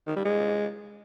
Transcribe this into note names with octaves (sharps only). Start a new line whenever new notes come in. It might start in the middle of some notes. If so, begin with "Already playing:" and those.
D#3
G3
G#3